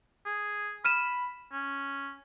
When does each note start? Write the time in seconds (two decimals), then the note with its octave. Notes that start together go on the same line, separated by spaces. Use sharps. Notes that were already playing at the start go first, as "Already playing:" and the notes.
0.26 G#4
0.85 B5 F6 D#7 E7
1.52 C#4